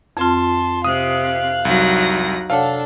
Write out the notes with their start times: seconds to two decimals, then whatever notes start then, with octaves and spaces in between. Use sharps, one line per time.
0.17 F2 C4 F4 A5 C6
0.85 C3 F5 D#6 F#6
1.65 C2 F#3 D#4 A#6
2.50 C3 D4 A4 C#5 F5 F#5